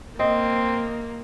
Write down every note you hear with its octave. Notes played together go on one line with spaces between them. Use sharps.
A#3 C4 D#5